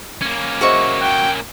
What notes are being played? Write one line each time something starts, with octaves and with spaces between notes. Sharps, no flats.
A#3 C#4
F#4 G#4 C5 D#5 E5 C#6
G5 F#6